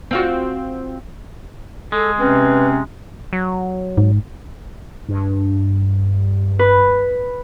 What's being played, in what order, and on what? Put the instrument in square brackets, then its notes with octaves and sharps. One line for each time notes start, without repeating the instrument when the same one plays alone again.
[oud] C4 F4 F#4
[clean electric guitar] G#3 [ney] A4
[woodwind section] C3 C4 C#4 [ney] B4
[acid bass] F#3
[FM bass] G#2
[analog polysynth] G2
[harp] B4